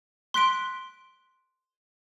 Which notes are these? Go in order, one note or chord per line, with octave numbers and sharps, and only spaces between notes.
C6 F#6 B6 D7